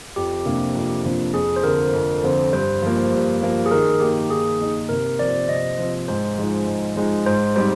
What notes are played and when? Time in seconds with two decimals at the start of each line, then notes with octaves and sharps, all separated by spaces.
0.16 F2 G4
0.45 C3 F3 A#3 D4
0.75 F2
1.04 C3 F3 A#3 D4
1.34 F2 G#4
1.56 C5
1.63 D3 F3 C4 A#4
1.93 F2
2.24 D3 F3 C4
2.52 G2 C5
2.82 F3 A#3
3.12 G2
3.42 F3 A#3
3.66 G#4
3.71 D#3 A#4
4.00 A#3 D#4 G4
4.30 D#3 G#4
4.60 A#3 D#4
4.89 C3 A#4
5.19 F3 C4 D5
5.48 C3 D#5
5.79 F3 C4
6.08 G#2 C5
6.37 F3 G#3 D#4
6.67 G#2
6.96 F3 G#3 D#4
7.26 G#2 C5
7.56 G3 C4 D#4 C5